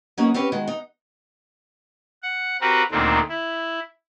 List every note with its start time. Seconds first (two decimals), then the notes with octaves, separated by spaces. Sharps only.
0.17 F#3 A#3 B3 C#4 D#4
0.34 C4 C#4 G4 B4
0.52 D#3 G#3 F#4
0.67 D#4
2.23 F#5
2.61 C4 F#4 G4 A#4 B4
2.91 D2 A#2 D#3 A3 C4 D4
3.29 E4